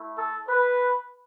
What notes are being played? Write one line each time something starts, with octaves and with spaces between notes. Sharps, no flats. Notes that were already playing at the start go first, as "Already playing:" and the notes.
Already playing: A3 E4
A4
B4